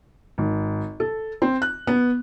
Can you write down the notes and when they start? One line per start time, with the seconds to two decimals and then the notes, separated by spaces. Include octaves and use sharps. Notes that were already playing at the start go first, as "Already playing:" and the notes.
0.38 G#1
1.00 A4
1.42 C4
1.62 F#6
1.87 B3